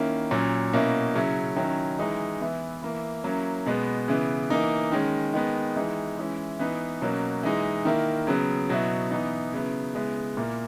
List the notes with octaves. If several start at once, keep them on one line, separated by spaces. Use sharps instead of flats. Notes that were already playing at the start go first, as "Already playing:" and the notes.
Already playing: D#3 A#3 C#4 E4
A#2 F#3 C#4
B2 A#3 C#4 E4
C#3 F#3 C#4 E4
D#3 F#3 C#4 E4
E3 G#3 D#4
E3 B3 E4
E3 A#3 E4
F#3 A#3 C#4 E4
B2 G#3 B3
C#3 E3 B3
E3 A#3 D#4
D#3 G#3 C#4
D#3 G#3 B3
E3 G#3 D#4
E3 G#3 C#4 E4
E3 B3 D#4
B2 F#3 A#3 C#4
E3 G#3 D#4
D#3 A#3 E4
C#3 F#3 B3
B2 F#3 B3 E4
E3 B3 D#4
C#3 F#3 B3 E4
C#3 G#3 B3 E4
A#2 A#3 E4